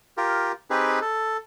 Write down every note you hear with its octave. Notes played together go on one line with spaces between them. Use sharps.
F4 G4 A#4
C4 D#4 G4 G#4 B4
A4